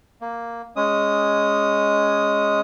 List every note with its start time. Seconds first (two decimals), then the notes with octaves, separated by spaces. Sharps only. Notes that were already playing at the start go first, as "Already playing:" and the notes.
0.21 A#3
0.76 G#3 C#4 D#6